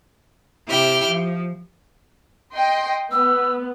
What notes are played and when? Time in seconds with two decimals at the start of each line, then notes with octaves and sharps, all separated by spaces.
0.68 C3 E4 G4 G5 F6
1.07 F3
2.53 D#5 G5 C6
3.12 B3 E6